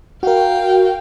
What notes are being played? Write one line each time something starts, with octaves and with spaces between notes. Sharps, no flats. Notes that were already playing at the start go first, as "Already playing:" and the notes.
F#4 A#4 F5 G5